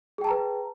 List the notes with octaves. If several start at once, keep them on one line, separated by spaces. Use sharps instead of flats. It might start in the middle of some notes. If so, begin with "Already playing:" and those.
G#4 B4 G5 A5 A#5